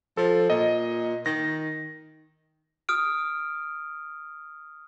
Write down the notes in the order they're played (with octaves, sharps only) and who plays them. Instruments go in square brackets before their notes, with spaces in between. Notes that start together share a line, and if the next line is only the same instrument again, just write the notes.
[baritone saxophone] F3 [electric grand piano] A4
[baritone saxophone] A#2 [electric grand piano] D#5
[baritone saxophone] D#3 [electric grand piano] A#6
[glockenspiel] D#6 F6 D7